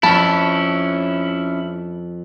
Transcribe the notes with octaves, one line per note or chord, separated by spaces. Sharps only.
F2 C#4 E4 A5